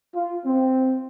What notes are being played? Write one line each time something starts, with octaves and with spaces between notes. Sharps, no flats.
F4
C4